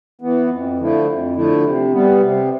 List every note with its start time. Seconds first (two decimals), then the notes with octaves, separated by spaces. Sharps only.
0.21 E3 B3
0.49 F2
0.78 D3 F3 A3 E4
1.07 F2
1.36 D3 F3 A3 E4
1.64 C3
1.93 G3 B3
2.21 C3